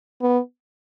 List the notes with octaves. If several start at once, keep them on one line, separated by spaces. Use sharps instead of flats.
B3